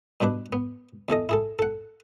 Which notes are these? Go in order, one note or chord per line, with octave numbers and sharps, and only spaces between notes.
G2 B2 D4 B4 D6
B3
E2 E3 A4 D#5
E4 G#4 A4
A4 F#5